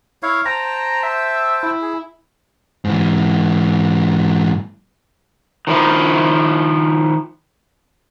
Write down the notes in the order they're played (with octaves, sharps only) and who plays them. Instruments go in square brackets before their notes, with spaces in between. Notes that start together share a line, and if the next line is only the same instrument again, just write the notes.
[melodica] E4 C#5 F5
[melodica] C5 G5 A5 [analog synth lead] A#5
[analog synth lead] E5
E4
[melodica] G#4
[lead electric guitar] G#2 E3
[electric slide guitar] D#3 F3 E4